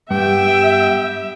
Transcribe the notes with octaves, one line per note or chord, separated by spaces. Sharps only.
G2 B3 G4 E5 G5